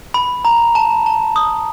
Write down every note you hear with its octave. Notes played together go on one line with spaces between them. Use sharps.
B5
A#5
A5
A5
D#6